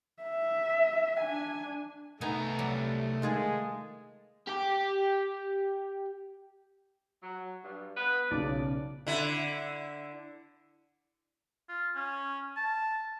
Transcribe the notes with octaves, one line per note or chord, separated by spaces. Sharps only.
E5
D4 G#5
C2 A3 B3 D#4 G#5 A#5
F#3 G3
D#3 G#3 F4 G#4
G4 G5
F#3
G2
B3 G#4 B4
B1 C#3 D5
D3 E4
F4
C#4
A5